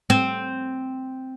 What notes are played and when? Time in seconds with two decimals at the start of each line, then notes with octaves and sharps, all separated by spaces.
0.10 C4